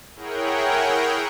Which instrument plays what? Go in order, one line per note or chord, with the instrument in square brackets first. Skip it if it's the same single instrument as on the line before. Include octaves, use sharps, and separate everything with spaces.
[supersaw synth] E4 G#4 A#4 C#5 F#5 G5